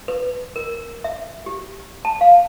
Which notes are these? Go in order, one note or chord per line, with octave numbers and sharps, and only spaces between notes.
B4
A#4
E5
G4
A5
F5